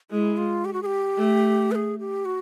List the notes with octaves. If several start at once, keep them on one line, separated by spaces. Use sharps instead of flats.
G#3 E4
F4
G4
F#4
G#4
G4
A3
B4
G#4
G4
F#4